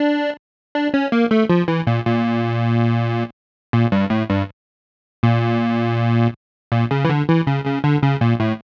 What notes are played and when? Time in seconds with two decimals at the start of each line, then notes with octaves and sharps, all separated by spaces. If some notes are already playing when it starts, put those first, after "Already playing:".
Already playing: D4
0.75 D4
0.94 C#4
1.12 A#3
1.31 A3
1.50 F3
1.68 E3
1.87 A#2
2.06 A#2
3.73 A#2
3.92 G2
4.10 A2
4.30 G2
5.23 A#2
6.72 A#2
6.91 C#3
7.05 E3
7.09 D3
7.28 E3
7.47 C#3
7.65 C#3
7.84 D3
8.03 C#3
8.21 A#2
8.40 A2